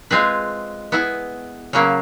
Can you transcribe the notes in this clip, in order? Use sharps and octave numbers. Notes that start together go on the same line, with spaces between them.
G#3 C4 F4 G#4 B4
B3 E4 G#4
C#3 F#3 A#3 C#4